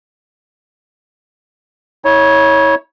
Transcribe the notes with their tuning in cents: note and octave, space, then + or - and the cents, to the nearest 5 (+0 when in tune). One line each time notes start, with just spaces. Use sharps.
E4 -40 C#5 +0